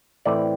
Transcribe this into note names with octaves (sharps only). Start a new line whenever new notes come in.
A2 E3 A3 C4 D5